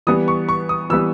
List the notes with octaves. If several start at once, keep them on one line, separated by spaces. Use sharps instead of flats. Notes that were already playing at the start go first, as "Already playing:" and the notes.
E3 G3 B3 D#6
C#6
C#6
D#6
E3 G3 B3 E6